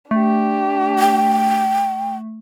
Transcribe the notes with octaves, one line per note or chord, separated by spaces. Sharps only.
A3 D4 G4
G5